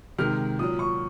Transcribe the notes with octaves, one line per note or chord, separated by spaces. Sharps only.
C3 D#3 G#3 F6
A#2 F#3 D#6
C#6